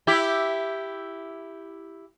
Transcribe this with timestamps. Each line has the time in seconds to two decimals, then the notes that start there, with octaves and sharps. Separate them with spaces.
0.07 E4 G4